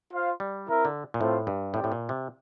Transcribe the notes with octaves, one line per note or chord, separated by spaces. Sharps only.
F4 C5 F5
G3
C4 E4 A#4 E5
D3
A#2
A2 A3 C4 F4 C5
G2
A2 C4 G4 D5 G5
A2
A#2
C3